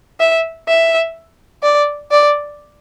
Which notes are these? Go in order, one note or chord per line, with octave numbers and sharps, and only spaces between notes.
E5
E5
D5
D5